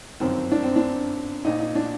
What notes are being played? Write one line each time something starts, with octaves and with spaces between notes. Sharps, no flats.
G1 F#2 D#3 C4
D4
C4
D4
A#1 A#2 D#4
D#4
D4